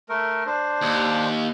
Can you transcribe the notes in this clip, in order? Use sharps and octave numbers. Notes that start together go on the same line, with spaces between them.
A3 A#4
D4 C5
D#2